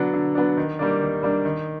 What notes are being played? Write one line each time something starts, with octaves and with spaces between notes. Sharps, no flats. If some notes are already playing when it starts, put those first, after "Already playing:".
Already playing: D3 F#3 B3 D4
D3
F#3 B3 D4
D#3
G3 A#3 D4
D#3
G3 A#3 D4
D#3